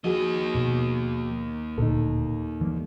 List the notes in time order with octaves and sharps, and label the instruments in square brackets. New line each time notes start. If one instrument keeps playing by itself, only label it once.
[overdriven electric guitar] D#2 D#5 [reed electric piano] F3 F#4 G#4
[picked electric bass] B2
[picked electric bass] D1 D2 A#2 [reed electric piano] D#4 A4
[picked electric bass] E3 G3 A#3